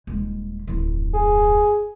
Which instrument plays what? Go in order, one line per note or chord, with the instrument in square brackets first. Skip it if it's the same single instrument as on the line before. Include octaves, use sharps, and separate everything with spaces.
[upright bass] D#1 G#3
D1 F2
[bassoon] G#4